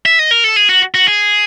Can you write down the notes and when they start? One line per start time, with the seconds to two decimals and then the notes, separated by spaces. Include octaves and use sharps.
0.06 E5
0.19 D#5
0.31 A#4
0.44 A4
0.56 G#4
0.69 F#4
0.94 F#4
1.07 G#4